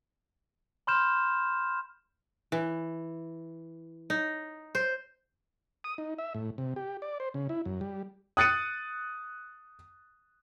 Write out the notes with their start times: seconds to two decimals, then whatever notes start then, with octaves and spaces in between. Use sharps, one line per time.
0.87 B5 C6 F6 G6 E7
2.52 E3
4.10 D#4
4.75 C5
5.84 D#6
5.98 D#4
6.18 E5
6.34 A2
6.58 C3
6.76 G4
7.02 D5
7.20 C5
7.34 C#3
7.49 E4
7.65 F#2
7.81 G3
8.37 D#6 F#6 A6 C#7 D#7